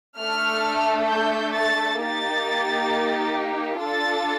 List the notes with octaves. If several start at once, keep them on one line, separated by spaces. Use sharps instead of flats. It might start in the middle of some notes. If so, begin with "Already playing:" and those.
A3 D4 A4 F6
G6
A6
A#3 D#4 G4 A6
D4 F4 A4 A6